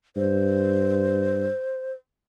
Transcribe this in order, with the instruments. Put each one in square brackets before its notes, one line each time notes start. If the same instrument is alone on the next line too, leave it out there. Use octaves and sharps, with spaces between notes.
[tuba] G2 [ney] C5